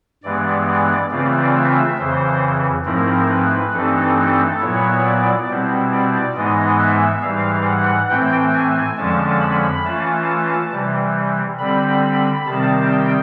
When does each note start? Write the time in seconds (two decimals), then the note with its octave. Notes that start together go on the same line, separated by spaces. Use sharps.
0.23 G2 E3 G#3 B3 D5
0.67 D5
1.10 C#3 E3 A3 C4 F4 D5
1.54 E5
1.99 F2 C#3 E3 C5
2.85 G#2 F3 A3 C4 E4 A#4
3.29 B4
3.73 G2 E3 A3 C4 D#4 A4
4.16 A4
4.60 A#2 F#3 B3 E4 C#5
5.05 D5
5.48 B2 G3 C4 E4
5.91 D5
6.35 G#2 E3 G#3 B3 D#4 D#5
6.79 E5
7.22 G#2 E3 G3 F5
7.66 F#5
8.09 A2 E3 A3 C4 G5
8.53 G#5
8.97 F2 D3 F3 G#3 C#4 A5
9.41 B5
9.84 E3 A3 C#4 F4 A5
10.72 C3 E3 G3
11.59 D3 G3 C4 B5
12.03 B5
12.46 C3 D#3 G3 C4 A5
12.91 G5